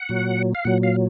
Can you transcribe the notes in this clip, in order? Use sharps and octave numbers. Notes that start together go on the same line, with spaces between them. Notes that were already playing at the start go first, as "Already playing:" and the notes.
Already playing: F#5
A#2 F#3
F5
A#2 F#3 F#5
F5